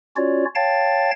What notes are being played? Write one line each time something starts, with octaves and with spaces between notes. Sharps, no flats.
C#4 F4 F#4 C#5 D5
C#5 F5 G5 A5 A6